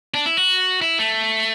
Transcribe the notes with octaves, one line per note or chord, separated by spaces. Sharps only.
D4
E4
F#4
E4
A3